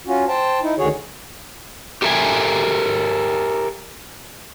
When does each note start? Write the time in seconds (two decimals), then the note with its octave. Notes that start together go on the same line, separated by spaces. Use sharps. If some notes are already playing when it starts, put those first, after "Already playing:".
0.07 C#4 F4 F#4
0.28 C5 G5 A5
0.62 D#4 E4
0.78 D2 D3 D#3 F#4 G#4 C#5
2.02 G4 A4 A#4 E5 G5 G#5